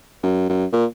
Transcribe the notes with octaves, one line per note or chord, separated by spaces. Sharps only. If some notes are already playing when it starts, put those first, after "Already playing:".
F#2
F#2
A#2